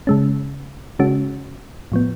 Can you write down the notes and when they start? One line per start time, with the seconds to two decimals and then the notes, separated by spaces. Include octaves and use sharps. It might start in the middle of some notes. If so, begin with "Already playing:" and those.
0.07 C#3 G#3 C#4
0.99 C#3 G#3 C#4 F#4
1.92 A2 F3 B3